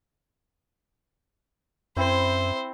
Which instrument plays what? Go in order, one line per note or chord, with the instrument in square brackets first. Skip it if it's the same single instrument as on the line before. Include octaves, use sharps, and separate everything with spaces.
[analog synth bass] F#2 [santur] C4 E4 [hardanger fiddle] C5